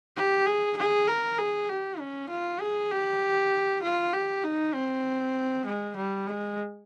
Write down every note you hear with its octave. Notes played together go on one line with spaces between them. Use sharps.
G4
G#4
G#4
A#4
G#4
G4
C#4
F4
G#4
G4
F4
G4
D#4
C4
G#3
G3
G#3